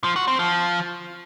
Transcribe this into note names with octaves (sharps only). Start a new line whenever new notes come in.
F3
F#4
C4
F3